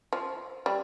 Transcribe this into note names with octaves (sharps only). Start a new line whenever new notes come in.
F3
G3